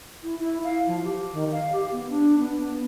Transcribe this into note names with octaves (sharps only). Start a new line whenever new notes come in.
E4
E4
F5
F3
G4
D#3
F5
G4
B3
D4
B3
B3